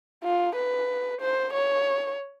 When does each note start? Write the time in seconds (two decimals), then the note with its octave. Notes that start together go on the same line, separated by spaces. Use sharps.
0.24 F4
0.56 B4
1.21 C5
1.53 C#5